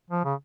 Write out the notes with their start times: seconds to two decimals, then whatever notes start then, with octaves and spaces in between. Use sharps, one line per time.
0.10 F3
0.24 C#3